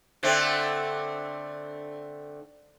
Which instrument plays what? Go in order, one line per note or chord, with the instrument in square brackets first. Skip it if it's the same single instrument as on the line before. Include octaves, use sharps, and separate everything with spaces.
[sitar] D3 A3 C4